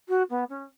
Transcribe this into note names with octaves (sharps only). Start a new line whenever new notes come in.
F#4
B3
C#4